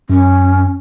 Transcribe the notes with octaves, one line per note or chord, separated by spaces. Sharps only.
F#2 C#4